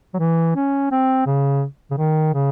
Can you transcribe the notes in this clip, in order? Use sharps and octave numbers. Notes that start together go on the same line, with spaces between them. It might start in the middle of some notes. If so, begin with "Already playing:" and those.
F#3
E3
C#4
C4
C#3
C#3
D#3
C#3